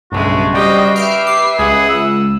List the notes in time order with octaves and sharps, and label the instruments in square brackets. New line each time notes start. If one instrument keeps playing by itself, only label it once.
[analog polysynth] B1 G2 [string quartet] C#3 G#3 A3 [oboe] F#4
[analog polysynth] G3 [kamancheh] G4 D#5 [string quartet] C5 F5 G5
[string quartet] G4 [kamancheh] B4 E5 [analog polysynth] F6 C7 D7
[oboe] D6 [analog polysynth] C7
[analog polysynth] C#2 [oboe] G#4 [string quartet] F#5 D#6
[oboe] E6